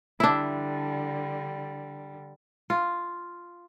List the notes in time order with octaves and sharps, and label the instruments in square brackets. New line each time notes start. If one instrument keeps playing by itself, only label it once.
[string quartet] D3 G3 [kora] D4 E4
[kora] F4